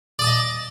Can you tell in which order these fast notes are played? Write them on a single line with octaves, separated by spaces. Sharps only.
D5 D#6 A5 D#5